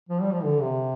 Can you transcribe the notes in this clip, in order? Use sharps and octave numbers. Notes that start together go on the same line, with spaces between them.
F3
G3
F3
D3
C3